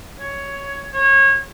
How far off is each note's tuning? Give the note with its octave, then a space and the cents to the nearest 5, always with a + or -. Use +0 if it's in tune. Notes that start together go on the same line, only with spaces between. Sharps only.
C#5 +10
C#5 -25